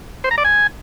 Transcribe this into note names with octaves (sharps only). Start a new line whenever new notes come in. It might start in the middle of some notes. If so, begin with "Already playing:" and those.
C5
A#5
D5
G#5